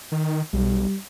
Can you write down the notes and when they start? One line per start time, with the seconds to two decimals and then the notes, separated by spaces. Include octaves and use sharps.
0.12 D#3
0.53 B1 G3